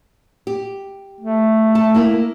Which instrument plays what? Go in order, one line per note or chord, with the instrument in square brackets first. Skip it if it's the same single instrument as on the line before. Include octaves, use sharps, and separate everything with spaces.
[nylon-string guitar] G4
[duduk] A3
[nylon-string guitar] A5
A#3 E4 A#4